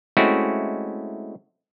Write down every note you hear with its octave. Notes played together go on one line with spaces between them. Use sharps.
G#3 A3 C4 C#4 E4 F#4